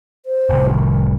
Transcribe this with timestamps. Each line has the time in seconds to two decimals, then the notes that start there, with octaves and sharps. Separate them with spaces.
0.26 C5
0.50 F1 C2
0.70 D#3